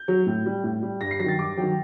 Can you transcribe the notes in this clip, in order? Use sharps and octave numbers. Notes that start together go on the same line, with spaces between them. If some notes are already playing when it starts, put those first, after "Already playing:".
Already playing: G6
F#3
A2
G3
A2
G3
G2 A#6
C7
D#3 F#3 A6 A#6
G2 D6
D#3 F#3 G5